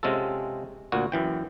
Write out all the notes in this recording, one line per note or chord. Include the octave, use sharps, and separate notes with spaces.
C3 G#3 C#4 F4 A4
D2 A#2 F#4
F#2 E3 G5